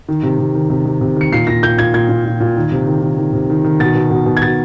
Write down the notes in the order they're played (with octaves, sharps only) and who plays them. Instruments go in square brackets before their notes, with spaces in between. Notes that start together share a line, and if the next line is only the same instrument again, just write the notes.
[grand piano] D#3
C3
C3
D#3
C3
C3
C3
D#3 C#7
A#2 C7
A#2 A#6
A#2 G6
A#2 G#6
A#2 G#6
A#2
A#2
A#2
D#3
C3
D#3
D#3
D#3
C3
D#3
D#3
B2 A6
B2
B2
B2
G#6
B2 A6